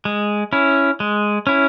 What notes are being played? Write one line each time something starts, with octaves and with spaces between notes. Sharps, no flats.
G#3
C#4 E4
G#3
C#4 E4